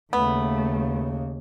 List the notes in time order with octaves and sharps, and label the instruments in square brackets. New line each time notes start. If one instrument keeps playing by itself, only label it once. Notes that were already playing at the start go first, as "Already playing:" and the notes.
[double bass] D#2 C#3 [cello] A3 [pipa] B3